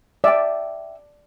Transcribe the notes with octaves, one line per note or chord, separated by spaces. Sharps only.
D5 E5 G5